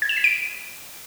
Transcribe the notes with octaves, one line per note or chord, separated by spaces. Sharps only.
G#6
E7
B6
D7